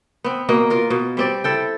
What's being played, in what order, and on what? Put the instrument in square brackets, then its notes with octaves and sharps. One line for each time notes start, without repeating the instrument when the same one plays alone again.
[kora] B3 C4
B2 A#3 D#5
F4 A#4
B2
G3 C4 D5
E4 A4 G5